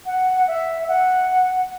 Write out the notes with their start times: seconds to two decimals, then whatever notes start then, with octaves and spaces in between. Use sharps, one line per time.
0.06 F#5
0.48 E5
0.88 F#5